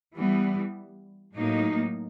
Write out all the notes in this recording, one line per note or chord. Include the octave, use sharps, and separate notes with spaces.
E3 G3 B3
A2 F#3 A#3 D#4